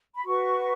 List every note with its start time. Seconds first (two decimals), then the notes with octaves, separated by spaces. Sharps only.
0.15 B5
0.25 F#4 B4 C#6